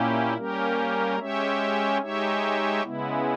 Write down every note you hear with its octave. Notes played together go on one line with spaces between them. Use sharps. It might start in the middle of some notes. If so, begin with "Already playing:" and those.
Already playing: A#2 A#3 C#4 E4 G4
G3 A#3 C#4 G4 A#4
G#3 C#4 G4 C#5 E5
G#3 D#4 G4 C#5 E5
C#3 G#3 B3 E4